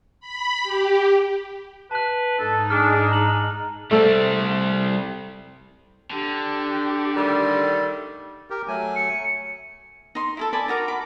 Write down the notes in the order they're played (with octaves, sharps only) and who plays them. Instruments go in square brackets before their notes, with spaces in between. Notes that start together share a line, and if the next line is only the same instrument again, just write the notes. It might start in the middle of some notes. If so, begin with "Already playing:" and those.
[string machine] B5
G4
[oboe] B4 [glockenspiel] A5 F#6
[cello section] G#2 D#4 [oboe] A4
[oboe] D4 [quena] G#4 [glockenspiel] F6
[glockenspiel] A#5 F#7
[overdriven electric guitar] G3 C4 [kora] A3 A4
[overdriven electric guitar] D3 [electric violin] D4 G4
[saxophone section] D#3 G3 A3
[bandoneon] G4 A#4
F#3 A3 G#5
[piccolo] C#7
[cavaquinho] D#4 C6
E4 G#4 A4
D5 G#5 A5 B5
D#4 F#4 A#4 D6
F#4 B5 D6